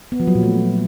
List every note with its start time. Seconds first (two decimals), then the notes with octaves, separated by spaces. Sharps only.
0.12 B3
0.20 F3
0.27 F#3
0.35 A#2
0.43 A3